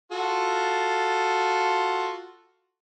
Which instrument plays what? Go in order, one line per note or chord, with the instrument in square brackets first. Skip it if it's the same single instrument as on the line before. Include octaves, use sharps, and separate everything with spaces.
[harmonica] F4 F#4 A4